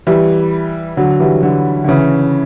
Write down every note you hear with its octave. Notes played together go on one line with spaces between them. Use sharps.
E3 G3
D3 F#3
E3 G3
D3 F#3
D3
C#3 E3